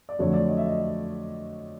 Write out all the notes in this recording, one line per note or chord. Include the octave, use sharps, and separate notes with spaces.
D5
F2 D3 F#3 A3 C#5
D5
D#5
E5
D#5